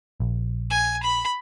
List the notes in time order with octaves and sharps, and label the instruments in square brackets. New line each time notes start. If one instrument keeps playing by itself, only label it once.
[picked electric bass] A#1
[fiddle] G#5
B5